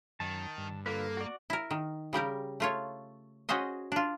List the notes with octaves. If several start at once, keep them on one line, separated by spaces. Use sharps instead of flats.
F#2 D#3 A5
G2
D3 A#3 F4 A4 B4
F#4 D5
E4 A#4
D#3
C#3 G3 G4 A#4
A3 F4 C#5
C#4 F#4 G#4 C5 D#5
D4 F4